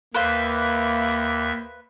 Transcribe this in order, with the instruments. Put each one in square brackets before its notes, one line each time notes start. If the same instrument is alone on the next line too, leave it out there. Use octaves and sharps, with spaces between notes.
[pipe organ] D#2 E5 [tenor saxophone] A#3 [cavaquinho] B4 C5 F5